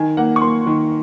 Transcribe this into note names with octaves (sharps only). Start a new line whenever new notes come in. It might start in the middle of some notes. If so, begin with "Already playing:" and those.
Already playing: D#3 G#5
A#3 F#5
C#6
A#3 C6
D#3